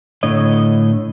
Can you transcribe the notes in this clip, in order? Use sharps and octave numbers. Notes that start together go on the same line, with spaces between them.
A2 D3 C#5 D#5